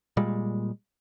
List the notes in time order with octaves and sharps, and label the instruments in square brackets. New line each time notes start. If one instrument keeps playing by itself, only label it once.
[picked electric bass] A#2 G3 G#3